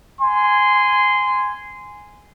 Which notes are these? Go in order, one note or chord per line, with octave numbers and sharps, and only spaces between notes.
G#5 C6